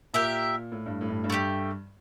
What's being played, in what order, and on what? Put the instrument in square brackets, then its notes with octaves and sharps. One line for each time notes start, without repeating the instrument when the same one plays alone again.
[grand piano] A#2 [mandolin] G4 A#4 E5
[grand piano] A2
G2
A2
G2
G2
[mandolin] A3 E4 G4